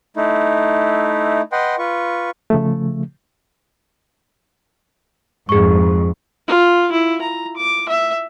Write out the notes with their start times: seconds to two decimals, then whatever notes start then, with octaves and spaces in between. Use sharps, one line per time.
0.17 A3 D#4 E4
1.52 B4 D#5 F#5 G5 C6
1.78 F4 B4 C#6
2.50 C#3 F3 A3
5.49 F2 G#2 G#4 C#6
6.47 F4
6.92 E4
7.22 A#5
7.57 D6
7.89 E5